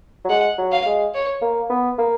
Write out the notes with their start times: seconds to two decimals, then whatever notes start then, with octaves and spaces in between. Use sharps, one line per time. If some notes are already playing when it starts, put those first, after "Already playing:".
0.25 F#3
0.29 G#3 F#5
0.58 F#3
0.72 F5
0.86 G#3
1.14 C#5
1.42 A#3
1.70 B3
1.98 A#3